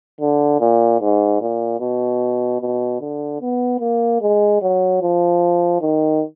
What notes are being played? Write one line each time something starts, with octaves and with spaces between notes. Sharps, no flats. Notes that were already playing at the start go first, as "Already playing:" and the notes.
D3
A#2
G#2
A#2
B2
B2
D3
B3
A#3
G#3
F#3
F3
D#3